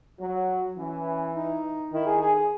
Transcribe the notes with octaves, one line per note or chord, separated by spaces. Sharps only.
F#3 F#4
E3 C#4
D#4
D#3 E4
G#4
G#4
G#4